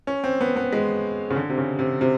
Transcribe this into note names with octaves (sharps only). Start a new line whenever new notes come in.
C#4
C4
B3
B3
G#3
C#3
D3
C3
C#3
C3
C3